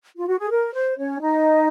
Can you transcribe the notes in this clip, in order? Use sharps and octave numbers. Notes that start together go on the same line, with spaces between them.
F4
F#4
G#4
A#4
C5
C#4 C#5
D#4 D#5